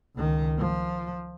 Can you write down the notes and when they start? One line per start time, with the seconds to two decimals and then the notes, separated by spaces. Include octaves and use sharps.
0.16 C#2 D#3
0.58 F3